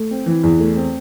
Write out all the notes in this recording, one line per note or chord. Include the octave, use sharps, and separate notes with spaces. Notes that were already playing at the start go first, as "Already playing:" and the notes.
Already playing: A3
C4
E3
E2
A3
C4